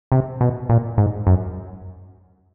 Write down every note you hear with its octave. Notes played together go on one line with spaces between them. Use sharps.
C3
B2
A#2
G#2
F#2